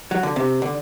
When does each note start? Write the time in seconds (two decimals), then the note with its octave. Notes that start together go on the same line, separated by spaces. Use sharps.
0.11 F#3
0.23 D3
0.36 C3
0.62 D3